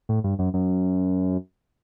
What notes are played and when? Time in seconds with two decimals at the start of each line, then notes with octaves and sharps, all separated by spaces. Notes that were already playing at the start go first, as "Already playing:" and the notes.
0.09 A2
0.24 G2
0.39 F#2
0.54 F#2